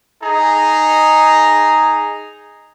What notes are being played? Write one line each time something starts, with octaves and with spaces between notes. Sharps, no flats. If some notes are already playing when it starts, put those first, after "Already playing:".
D#4 G#4 A#5